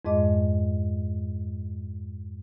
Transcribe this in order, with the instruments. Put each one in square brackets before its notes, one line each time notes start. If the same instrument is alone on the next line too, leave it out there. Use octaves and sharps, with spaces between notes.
[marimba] F2 G#2 G#3 D#5 D6